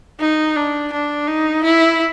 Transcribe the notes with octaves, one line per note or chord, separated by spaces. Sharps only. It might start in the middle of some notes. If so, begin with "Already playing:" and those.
D#4
D4
D4
D#4
E4